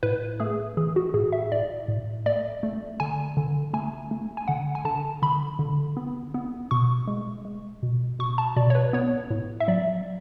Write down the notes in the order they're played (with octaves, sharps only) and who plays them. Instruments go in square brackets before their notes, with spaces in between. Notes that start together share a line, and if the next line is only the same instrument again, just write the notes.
[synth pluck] A2 B4
A3 G#4
E3 G#4
F#4
A2 G#4
E5
A2 D5
A2
A3 D5
A3
D3 G#5
D3
A3 G#5
A3
G#5
D3 F#5
G#5
D3 A5
D3 B5
D3
B3
B3
B2 C#6
G#3
G#3
B2
B2 C#6
A5
B2 D5
C#5
B4
B3 C#5
A2
E5
F#3 D5